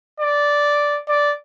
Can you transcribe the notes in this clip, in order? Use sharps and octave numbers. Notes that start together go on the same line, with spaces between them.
D5
D5